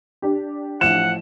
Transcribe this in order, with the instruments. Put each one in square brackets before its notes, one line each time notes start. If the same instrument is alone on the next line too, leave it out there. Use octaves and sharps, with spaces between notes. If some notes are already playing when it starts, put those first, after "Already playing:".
[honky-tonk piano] D4 G4
[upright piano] A1 F3 [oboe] F#5 [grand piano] E7